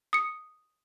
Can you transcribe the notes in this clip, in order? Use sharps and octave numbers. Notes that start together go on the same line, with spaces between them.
D#6 C#7